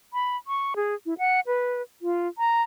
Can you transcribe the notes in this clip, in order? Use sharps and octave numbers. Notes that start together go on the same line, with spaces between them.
B5
C#6
G#4
E4
F#5
B4
F4
A#5